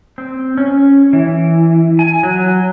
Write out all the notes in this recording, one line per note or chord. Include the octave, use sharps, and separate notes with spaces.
C4
C#4
E3
G#5
F#3